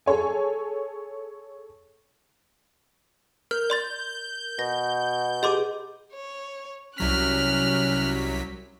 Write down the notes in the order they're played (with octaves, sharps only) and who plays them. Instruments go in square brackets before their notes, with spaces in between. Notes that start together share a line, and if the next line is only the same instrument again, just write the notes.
[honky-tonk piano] G#4 A4 C#5 G#5
[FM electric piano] A#4 [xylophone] F6 [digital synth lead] G6
[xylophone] D5 C6 A6
[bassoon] B2 [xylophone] A#6
[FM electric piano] G4 G#4 [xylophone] D#5 C6 D6
[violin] C#5
[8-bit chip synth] C2 F#3 B6 [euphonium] C#4 [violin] F6 F#6